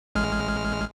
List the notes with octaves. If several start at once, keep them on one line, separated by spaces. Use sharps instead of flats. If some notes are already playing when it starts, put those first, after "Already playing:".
A1 G#3 F6